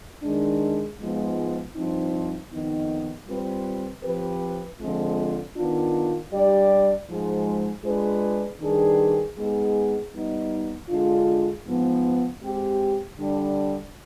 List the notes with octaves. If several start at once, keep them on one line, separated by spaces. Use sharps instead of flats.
D#3 G#3 D4
G#2 F3 G#3 B3 F4
G2 F3 C4 D#4
F2 D#3 B3 D#4
G3 C4 F4 B4
F3 C4 G4 B4
D3 F3 G#3 C4 F4
D#3 B3 D4 F4
G3 D4 G4 D5
G#2 F3 G#3
G#3 D4 F4 G#4 B4
D#3 G3 D4 G#4 B4
G#3 B3 D#4 G#4
G3 B3 D#4
D3 G#3 D4 F4
G#2 F3 B3
G#3 C4 G4
D3 G3 D4